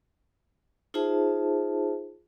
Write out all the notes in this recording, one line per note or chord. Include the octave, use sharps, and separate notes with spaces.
D#4 F4 G#4 C5 E5 A5